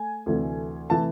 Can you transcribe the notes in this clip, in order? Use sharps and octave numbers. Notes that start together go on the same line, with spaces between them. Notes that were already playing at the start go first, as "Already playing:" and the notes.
Already playing: A3 G#5
D2 C3 E3 A3
C3 E3 A3 A5